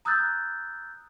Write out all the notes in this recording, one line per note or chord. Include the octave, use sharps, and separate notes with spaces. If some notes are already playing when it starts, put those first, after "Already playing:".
A#5 D#6 E6 F#6 G6 A6